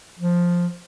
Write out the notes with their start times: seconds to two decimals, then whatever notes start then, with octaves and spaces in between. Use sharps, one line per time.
0.19 F3